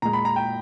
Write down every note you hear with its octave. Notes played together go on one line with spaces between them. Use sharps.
A#2 G#3 A#5
B5
A#5
G5